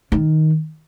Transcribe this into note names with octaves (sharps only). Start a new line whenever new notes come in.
D#3